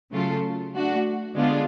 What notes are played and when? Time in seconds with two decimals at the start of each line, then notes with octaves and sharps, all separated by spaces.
0.12 C#3 F#3 A3 F4 A4
0.74 A3 D4 F#4
1.35 D3 G#3 B3 D4 F4